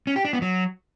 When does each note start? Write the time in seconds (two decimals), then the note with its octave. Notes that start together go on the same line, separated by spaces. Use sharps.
0.07 C#4
0.16 G4
0.25 D4
0.33 B3
0.42 F#3